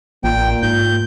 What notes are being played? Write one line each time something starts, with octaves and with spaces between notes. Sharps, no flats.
A1 A#2 A#3 G5
G#2 G6